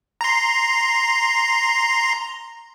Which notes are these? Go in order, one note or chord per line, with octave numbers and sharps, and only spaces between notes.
A#5 C6